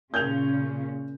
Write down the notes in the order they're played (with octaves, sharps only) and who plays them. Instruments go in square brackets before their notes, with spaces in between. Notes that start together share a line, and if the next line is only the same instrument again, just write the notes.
[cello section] A#2 C#3 C#4 [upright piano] G6 G#6 F7